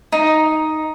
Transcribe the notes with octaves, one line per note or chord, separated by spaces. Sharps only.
D#4